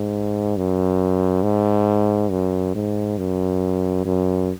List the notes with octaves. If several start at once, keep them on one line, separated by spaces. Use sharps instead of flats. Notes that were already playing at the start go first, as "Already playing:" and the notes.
Already playing: G#2
F#2
G#2
F#2
G#2
F#2
F#2